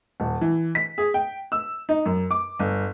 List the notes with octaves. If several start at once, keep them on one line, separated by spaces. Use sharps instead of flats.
D#1
E3
B6
G#4
G5
E6
D#4
F#2
D6
G1